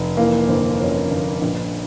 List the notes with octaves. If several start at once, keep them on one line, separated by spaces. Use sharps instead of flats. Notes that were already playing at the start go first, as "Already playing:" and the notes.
Already playing: F1
E3 A#3
G1 C4
F2 C#4
G1
A#1